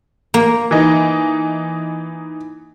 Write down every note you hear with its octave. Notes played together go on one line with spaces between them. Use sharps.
A#3
E3 D#4